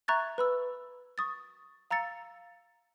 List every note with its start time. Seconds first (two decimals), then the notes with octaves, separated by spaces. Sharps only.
0.08 E5 A#5 C#6 F#6 G#6 A6
0.38 B4 B5 E6
1.18 C#6 D#6 A6
1.91 F5 A#5 E6 A6 C#7